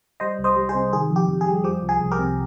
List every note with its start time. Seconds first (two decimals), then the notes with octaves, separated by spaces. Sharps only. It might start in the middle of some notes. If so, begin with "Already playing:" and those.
0.20 G3 C5 D#5
0.39 C2
0.44 C5 D#5
0.56 G3
0.69 G#4 C5
0.75 C3
0.93 D#3 G#4
1.10 F2
1.16 G4
1.28 F2
1.41 G#4
1.46 G3
1.64 F3 G4
1.82 C2
1.89 G#4
2.00 C2
2.12 G4 A#4
2.19 C3